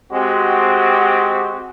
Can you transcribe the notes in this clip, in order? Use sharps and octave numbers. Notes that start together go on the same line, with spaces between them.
G#3 C4 F#4 G4